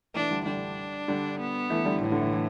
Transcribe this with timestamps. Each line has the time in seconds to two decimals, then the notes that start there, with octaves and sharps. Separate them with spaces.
0.14 E3 A3 D4
0.31 D3 G3
0.45 D3 G3 D4
1.08 D3 G3
1.40 B3
1.70 E3 A3
1.85 D3 G3
2.01 A2 E3
2.12 D3
2.22 E3
2.33 E3